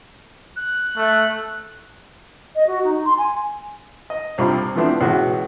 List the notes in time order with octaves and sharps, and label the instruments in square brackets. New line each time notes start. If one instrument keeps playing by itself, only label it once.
[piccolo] F#6
[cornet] A3
[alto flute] D#5
F#4
D#4
C6
G#5
[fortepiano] D#5
C2 G2 G3 F4 B5 D6
E3 F3 A3 B3 C4 D4
C#2 B2 E3 F#4 B4